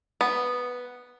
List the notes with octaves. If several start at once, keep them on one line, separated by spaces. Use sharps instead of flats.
B3